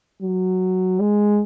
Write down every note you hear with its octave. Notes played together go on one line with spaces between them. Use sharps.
F#3
G#3